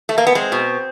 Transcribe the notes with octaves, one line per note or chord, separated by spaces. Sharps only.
A3
A#3
B3
G#3 C4
B2